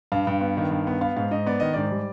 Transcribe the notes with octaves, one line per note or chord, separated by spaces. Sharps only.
G2 F5
G2
B3
D#3
G2
B3
B3 F5
G#2 F5
G#2 D#5
B3 D5
D#3 D#5
G#2 D5
G3